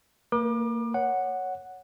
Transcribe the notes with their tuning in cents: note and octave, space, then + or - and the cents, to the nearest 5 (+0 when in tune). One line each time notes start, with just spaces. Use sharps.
A#3 -25 A#4 +45 D6 +30
C#5 +5 F#5 +0